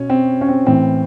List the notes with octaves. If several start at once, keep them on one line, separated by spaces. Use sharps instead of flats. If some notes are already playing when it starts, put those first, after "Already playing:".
Already playing: B2 C#4
C4
C#4
C4
A2 E3 C4